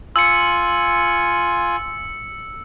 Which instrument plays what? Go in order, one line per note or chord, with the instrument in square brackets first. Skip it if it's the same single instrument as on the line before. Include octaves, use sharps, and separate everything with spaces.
[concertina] F4 G#5 [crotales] E6 C#7